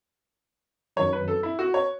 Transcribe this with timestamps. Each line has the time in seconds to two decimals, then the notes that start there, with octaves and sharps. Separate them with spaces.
0.96 F#2 D#3 F#3 C#5
1.13 B4
1.28 A4
1.43 E4
1.59 F#4
1.74 C#5